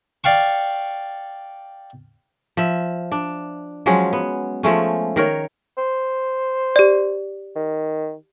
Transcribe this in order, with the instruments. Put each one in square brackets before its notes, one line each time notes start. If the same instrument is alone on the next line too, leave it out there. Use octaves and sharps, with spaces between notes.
[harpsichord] D5 F5 G5 C#6
[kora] F3 E5
D4
F3 F#3 G#3 C#4
B3
F3 G#3 A3 C#4
D#3 A#4 C#5
[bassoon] C5
[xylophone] G4 D5
[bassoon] D#3